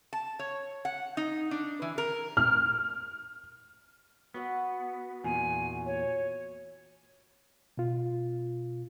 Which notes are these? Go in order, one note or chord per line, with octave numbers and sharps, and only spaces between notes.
A5
C#5
F#5
D#4
D4
E3
A#4
F6
B3 F#4 E5 F#5
E2 A#2 G#5
C#5
B2 F4